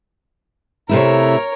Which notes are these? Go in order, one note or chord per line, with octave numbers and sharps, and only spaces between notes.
C3 A3 E4 A#4 C#5